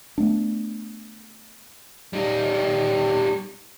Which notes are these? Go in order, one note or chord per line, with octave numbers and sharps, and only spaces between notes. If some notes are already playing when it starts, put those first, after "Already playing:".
A3 B3 D4
G3 D#4